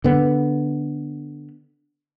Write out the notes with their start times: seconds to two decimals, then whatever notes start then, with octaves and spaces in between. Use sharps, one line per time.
0.04 D3 B3